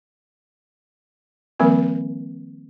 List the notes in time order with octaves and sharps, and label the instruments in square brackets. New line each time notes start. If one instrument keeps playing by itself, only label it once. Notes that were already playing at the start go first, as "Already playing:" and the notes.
[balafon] D#3 F3 G3 A#3 C4 A#4